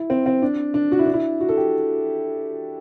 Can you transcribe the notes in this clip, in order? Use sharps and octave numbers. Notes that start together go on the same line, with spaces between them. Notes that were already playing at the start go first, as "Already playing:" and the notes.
Already playing: E4
C4
C4
D4
D4
F#4
E4
D4
E4
F#4
A4
G4